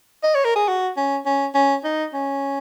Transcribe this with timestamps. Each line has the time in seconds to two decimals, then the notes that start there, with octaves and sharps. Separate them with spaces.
0.23 D#5
0.35 C#5
0.45 A#4
0.56 G#4
0.68 F#4
0.97 C#4
1.26 C#4
1.55 C#4
1.84 D#4
2.13 C#4